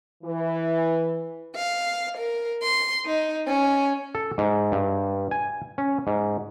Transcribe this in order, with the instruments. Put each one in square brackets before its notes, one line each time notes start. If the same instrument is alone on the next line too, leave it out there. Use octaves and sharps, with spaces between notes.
[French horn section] E3
[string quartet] F5
A#4
C6
D#4
C#4
[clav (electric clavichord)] A4
G#2
G2
G#5
C#4
G#2